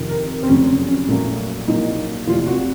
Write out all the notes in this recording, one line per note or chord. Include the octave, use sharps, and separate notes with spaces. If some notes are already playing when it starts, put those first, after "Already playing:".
Already playing: F2 C3 D#3
A#4
C4
F1 F2 C#3 F#3 C#4
C#4
A#1 A#2 F#3 A3
A#1 A#2 F#3 D#4
F1 F2 C3 F4
F#4